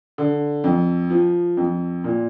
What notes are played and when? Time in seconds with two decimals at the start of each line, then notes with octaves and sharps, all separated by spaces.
0.18 D3
0.64 F2
1.10 F3
1.57 F2
2.04 A#2